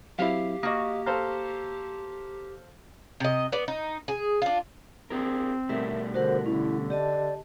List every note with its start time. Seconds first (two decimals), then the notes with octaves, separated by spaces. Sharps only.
0.19 F#3 C4 E4 G4 F5
0.63 A#3 F#4 D#5 F5 D#6
1.06 A4 C5 F5 A#5
3.20 C3 D#5
3.52 B3 D5
3.68 D#4
4.08 G#4
4.42 D4 F4
5.10 C4 F4 G#4 A#4
5.69 B2 G3 A3 A#4 E5
6.14 D3 F#4 A#4 C5 F#5
6.46 D3 C#4 E4
6.90 G4 D5 D#5 A5